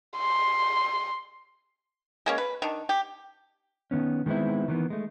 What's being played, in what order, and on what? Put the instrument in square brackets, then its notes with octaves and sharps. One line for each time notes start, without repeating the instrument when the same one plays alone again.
[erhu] C6
[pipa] G#3 A#3 C#4
B4
D#3 D4
G4
[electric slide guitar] D#3 E3 B3 C#4
D#3 G#3 B3 C4 E4
D#3 E3 B3
G#3 A3